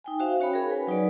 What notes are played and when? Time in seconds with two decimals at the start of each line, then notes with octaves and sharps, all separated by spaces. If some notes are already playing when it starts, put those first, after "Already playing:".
0.04 D#4 G5 G#5
0.20 F#4 C5 E5 F5
0.40 C#4 F#4 C#5 G5 B5
0.53 G#4 A#4
0.71 B4 G#5
0.87 F#3 D#4 B4 D5